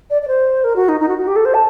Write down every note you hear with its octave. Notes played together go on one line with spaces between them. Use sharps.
D5
D5
C5
A#4
F#4
D#4
D#4
F#4
F#4
G4
A4
C5
A5